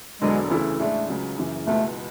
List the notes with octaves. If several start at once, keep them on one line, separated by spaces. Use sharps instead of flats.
E1 E2 D3 F#3 G#3
D2 C#3 E3 A3 E4
A2 G#3 A3 D4
C#2 C#3 F#3
F#1 F#2 C#3 E3
C#2 B2 G#3 A3 B3 E4